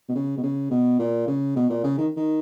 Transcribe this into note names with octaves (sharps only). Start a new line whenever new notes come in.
B2
C#3
B2
C#3
B2
A#2
C#3
B2
A#2
C#3
D#3
D#3